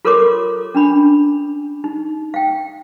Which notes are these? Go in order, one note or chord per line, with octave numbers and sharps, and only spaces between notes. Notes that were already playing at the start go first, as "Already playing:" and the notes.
F4 A4 A#4 C#5 C6 D6
C#4 D4 B5
D#4
F5 G5